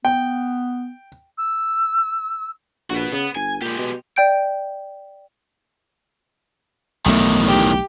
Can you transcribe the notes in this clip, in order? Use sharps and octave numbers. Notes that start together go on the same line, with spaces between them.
B3 G5
E6
A#1 F#4 B4
C#3 B3
G1 G#5
A#2 G#3 G4
B2
D5 G5 G6 D7
B1 E2 A2 D#3 A3
G4